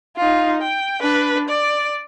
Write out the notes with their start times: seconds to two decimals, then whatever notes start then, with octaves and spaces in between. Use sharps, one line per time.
0.17 D#4 F4
0.62 G5
1.01 D4 B4
1.49 D5